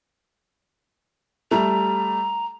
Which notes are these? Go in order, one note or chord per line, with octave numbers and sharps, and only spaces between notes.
G3 A3 A#5